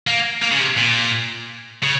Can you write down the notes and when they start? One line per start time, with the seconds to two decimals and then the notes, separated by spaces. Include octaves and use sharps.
0.07 A#3
0.42 A#3
0.51 C#3
0.60 C3
0.77 A#2
1.83 C#3